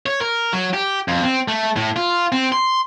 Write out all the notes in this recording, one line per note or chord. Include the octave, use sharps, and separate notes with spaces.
C#5
A#4
F#3
G4
F2
C4
A3
A2
F4
C4
C6